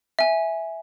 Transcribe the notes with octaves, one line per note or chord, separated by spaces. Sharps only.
E5 G#5